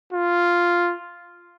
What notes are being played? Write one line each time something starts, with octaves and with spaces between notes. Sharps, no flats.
F4